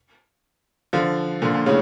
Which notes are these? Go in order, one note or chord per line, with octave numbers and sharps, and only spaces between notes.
D3 F3
A#2 D3
A#2
A2 C#3